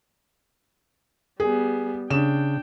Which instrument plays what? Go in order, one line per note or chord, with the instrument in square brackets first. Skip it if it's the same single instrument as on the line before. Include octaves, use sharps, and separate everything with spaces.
[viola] G3 B3 [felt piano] G#4
[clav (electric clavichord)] C#3 [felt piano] D4 E7 [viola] G5